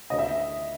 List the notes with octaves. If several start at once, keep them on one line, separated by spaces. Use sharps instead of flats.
D2 D#5
E5